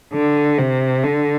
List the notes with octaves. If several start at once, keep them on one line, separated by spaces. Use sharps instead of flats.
D3
C3
D3